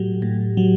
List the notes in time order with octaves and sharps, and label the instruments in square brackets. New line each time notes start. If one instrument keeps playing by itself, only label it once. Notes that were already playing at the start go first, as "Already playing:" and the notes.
Already playing: [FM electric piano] A2 F#3 G4
A2
F#3